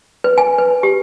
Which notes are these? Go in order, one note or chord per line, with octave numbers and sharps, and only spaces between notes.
B4
G#5
B4
G4